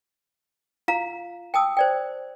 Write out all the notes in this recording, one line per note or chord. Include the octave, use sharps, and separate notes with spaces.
F4 F5 A#5
G5 A5 D#6 E6
C5 D5 G5